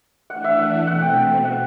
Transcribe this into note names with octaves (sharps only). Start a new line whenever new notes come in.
E3 A3 D4 F#5
E5
F#5
B2 A3 C4 F#5
G5
F#5